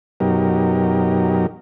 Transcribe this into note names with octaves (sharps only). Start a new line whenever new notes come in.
F#2 B2 F#3 D#4 G4 A#4